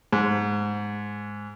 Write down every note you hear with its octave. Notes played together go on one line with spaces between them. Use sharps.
G#2